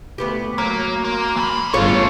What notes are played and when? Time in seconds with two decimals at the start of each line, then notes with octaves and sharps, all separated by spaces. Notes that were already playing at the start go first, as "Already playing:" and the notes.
0.18 D2 B3 G4
0.58 F#3 A#3
1.04 A#3 C6
1.37 E3 B5
1.73 G1 A3 C#4 D4 F4 G#4 C#5 F5